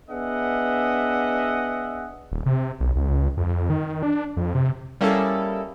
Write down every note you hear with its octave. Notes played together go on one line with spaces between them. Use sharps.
B3 D4 G#4 D#5 E5 F#5
D#1
C3
B1
C#2
F2
D#3
D4
F2
C3
G3 A#3 C#4 E4 G#4 A4